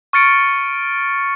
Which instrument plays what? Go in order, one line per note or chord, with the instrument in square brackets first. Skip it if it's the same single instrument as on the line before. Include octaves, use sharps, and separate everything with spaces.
[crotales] C#6 F6 A6 C#7 D7